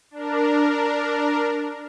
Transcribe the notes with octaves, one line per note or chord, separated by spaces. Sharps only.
D4 A#4